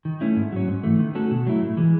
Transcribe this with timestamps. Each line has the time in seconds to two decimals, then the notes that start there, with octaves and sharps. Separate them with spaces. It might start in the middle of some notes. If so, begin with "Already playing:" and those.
0.05 D#3
0.21 A3 C#4 E4
0.36 G#2
0.52 F#3 C#4
0.68 G#2
0.83 E3 A3
0.99 D#3
1.15 A3 C#4 F#4 A4
1.31 B2
1.47 F#3 A3 E4
1.62 A2
1.77 E3 G#3